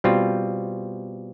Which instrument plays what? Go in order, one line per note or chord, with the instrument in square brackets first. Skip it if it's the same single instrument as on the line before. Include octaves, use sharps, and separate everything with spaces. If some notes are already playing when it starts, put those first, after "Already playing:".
[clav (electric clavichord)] B2 G3 C4 F4